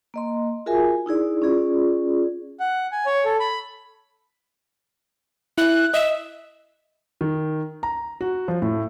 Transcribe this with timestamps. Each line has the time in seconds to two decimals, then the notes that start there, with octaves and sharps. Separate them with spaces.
0.14 A#3 D#5 C6
0.66 F4 F#4 G#4 A#4 E5 G#5
1.06 D#4 E4 G#4 D5
1.42 C#4 F4 G#4 D5
2.60 F#5
2.92 G#5
3.06 C#5
3.25 A4
3.40 B5
5.58 E4 E5 F#6
5.94 D#5 E5
7.21 D#3
7.83 A#5
8.21 F#4
8.48 F3
8.62 A2